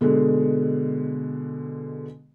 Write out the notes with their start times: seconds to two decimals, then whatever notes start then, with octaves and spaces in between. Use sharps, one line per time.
0.01 B2 D3 G#3